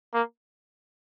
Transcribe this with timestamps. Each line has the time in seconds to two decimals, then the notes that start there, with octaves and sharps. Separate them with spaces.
0.14 A#3